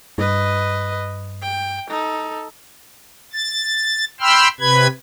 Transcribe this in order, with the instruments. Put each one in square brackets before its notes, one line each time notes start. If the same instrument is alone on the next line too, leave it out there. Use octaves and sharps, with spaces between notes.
[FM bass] G2 [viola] B4 D#5
[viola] G5
D#4 A4
[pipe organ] A6
G5 B5 C6 E6 F6
C3 B4 B5 G#6